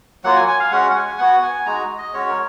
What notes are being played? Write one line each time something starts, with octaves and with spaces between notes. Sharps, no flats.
F#3 A#3 F4 F#5
G#5
G#5
F5
G#3 C#4 F#4 F#5
F#5
G#5
B3 F#4 F#5
G#5
G#3 D#4 F#4 A#5
D#5
G#3 C#4 F#4 C#5
A#4